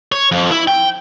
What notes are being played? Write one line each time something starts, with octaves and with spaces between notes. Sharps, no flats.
C#5
F2
E4
G5